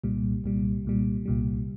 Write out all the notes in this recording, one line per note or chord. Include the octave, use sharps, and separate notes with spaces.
C2 A#2 G3
C2 A#2 G3
C2 A#2 G3
C2 A#2 G3